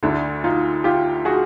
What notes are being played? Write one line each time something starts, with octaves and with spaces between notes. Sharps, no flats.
D2 D3 D4 E4
D#4 F4
F4 G4
F#4 G#4